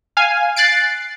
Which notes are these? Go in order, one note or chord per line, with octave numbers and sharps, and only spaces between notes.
F5 G#5
F#6 A6 C7 D7